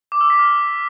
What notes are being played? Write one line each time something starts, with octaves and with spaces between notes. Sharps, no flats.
D6
E6
B6
F6
E6